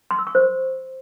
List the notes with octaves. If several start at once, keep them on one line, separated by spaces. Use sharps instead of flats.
C6
E6
C#6
C5